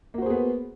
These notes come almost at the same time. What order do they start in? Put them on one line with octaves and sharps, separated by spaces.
A#3 F#4 C5 G#4 B3